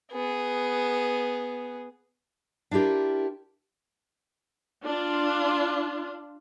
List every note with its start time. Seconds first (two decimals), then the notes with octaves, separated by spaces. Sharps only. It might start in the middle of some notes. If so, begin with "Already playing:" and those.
0.12 B3 G#4
2.71 D4 E4 F4 G4 A#4
4.85 D4 F4